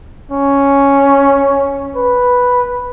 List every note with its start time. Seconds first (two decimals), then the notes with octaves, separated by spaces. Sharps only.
0.31 C#4
1.96 B4